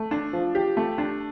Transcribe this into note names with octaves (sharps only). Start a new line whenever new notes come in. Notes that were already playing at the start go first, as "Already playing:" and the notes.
Already playing: A3
D4
F3
G4
A3
D4